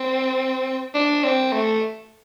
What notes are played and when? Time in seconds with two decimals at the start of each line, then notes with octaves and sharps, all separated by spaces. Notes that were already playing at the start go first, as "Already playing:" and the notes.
Already playing: C4
0.95 D4
1.24 C4
1.52 A3